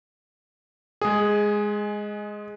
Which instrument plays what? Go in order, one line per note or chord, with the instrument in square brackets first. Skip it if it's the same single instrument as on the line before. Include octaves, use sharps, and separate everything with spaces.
[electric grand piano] G#3 G#4